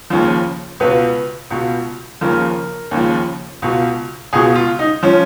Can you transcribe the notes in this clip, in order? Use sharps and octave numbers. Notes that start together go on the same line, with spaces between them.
D#2 C#3 F3
C#2 B2 B4
C#2 B2
D#2 C#3 F3 A#4
D#2 C#3 F3
C#2 B2
C#2 B2 G#4
F4
D#4
F3 C#4